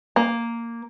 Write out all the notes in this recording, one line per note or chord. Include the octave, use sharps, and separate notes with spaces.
A#3